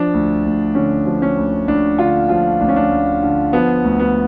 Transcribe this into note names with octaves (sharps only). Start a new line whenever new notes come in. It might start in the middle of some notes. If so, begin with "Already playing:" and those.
Already playing: F3 D4
D2
D2
D3 C#4
F3
C#4
D2
D2 D4
D3 F4
F3 F4
D2 D4
C#4
D4
D2
D3
F3 B3
D2
B3